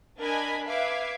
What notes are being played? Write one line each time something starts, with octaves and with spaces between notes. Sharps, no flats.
D4 A#4 D#5 G#5 B5 G#6
B4 E5 F5 D6 G#6